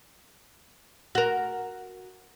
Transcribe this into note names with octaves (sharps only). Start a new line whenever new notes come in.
F#4 A#4